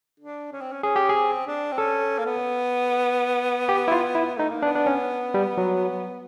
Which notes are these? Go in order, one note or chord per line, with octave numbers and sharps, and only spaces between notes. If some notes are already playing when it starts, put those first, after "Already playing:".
D4
C#4
C4
C#4
C#4 G#4
G4
G#4
C4
D4
C4
C#4 A4
A#3
B3
G4
E4
F4
E4
A3 D#4
A#3
B3 D4
D4
C#4
G3
F#3